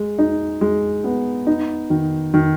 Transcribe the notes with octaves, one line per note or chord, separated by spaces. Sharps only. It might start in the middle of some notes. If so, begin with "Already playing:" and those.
Already playing: G#3
D#4
G#3
B3
D#4
D#3
D#3